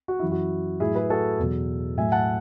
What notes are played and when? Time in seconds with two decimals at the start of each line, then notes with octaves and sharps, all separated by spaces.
0.08 F#4
0.19 F#2 E3 E4
0.32 F#4
0.80 A2 F#3 E4 G#4
0.95 G#4 B4
1.10 F#4 A4
1.39 E2 B2 F#3
1.97 A2 F#3 E5 G#5
2.12 F#5 A5